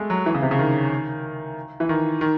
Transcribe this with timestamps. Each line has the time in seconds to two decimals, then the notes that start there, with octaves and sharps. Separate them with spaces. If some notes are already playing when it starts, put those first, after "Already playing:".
Already playing: G#3 A3
0.10 F#3
0.26 E3
0.34 C#3
0.42 C3
0.51 C#3
0.59 D#3
1.80 E3
1.89 D#3
2.21 D#3